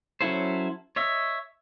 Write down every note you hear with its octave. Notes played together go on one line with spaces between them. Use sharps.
F#3 C#4 E4 A4 C5
C#5 D#5 E5